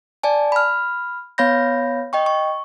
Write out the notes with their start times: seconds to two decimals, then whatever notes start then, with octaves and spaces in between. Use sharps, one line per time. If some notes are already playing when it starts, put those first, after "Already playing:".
0.23 D5 G#5 A5
0.52 B5 F6
1.38 B3 C#5 F5 B5 G6 A#6
2.13 D#5 G5 C#6
2.26 C#6